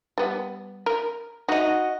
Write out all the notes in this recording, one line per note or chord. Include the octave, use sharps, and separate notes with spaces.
G3 B3
A#4
D#4 F#4 D#5